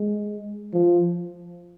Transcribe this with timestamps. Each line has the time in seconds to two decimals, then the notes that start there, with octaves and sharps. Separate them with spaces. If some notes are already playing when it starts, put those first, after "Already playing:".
Already playing: G#3
0.73 F3